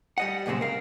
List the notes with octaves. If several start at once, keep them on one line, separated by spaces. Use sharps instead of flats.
G3 D#5 F#5
F#2 A#2 C#3 G#3 C4
A#4 F5